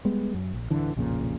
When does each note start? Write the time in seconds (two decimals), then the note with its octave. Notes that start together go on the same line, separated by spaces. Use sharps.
0.05 G3 G#3 B3
0.34 F#2
0.54 A#1
0.70 D1 D3 E3
0.96 B1 F2 A#2 C#3